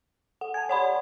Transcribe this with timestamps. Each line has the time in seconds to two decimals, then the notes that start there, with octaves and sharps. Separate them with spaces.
0.41 A4 F#5
0.54 G#5 A5 G#6
0.69 G4 C#5 D5 F#5 B5 C6